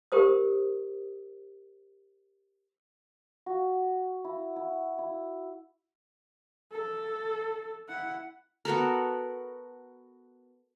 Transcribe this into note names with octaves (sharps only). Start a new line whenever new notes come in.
G4 A#4 C5 D#6
F#4
E4
E4
E4
A4
E4 F#5
B3 F#4 A4 A#4